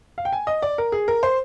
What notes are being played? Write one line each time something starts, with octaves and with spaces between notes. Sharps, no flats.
F5
G5
G#5
D#5
D5
A#4
G#4
A#4
C5